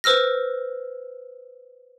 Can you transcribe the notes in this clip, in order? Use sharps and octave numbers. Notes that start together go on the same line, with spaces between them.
B4 C5 E6 F6 A#6